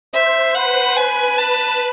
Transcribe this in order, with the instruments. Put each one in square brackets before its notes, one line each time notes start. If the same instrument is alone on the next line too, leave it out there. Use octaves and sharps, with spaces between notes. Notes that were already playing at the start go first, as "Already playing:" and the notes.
[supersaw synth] C5 [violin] E5
[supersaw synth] B4 [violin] F#5
[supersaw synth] B4 [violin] G#5
[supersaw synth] B4 [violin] A5